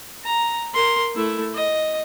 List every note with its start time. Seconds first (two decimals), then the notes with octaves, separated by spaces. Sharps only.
0.24 A#5
0.74 A#4 C6
1.15 A3 E4
1.54 D#5